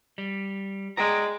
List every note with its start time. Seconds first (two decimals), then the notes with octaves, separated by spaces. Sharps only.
0.18 G3
0.97 G#3 D5 G5 A#5